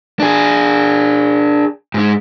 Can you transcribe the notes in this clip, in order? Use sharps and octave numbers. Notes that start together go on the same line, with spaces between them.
D4 G#4
G#2 G#3